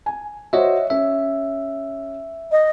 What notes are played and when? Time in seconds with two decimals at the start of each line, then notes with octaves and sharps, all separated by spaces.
0.06 G#5
0.53 F#4 C5 C#5 D#5 E5
0.90 C#4 E5
2.51 D#5